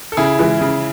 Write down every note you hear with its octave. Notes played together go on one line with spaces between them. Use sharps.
A4
C#3 E4 G#4
E3 G#3
C#3